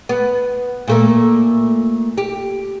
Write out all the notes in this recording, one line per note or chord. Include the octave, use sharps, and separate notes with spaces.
B3
A#2 A3 A#3
G4